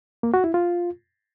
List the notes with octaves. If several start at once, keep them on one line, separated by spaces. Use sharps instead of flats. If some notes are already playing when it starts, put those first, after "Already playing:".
A#3
F#4
E4
F4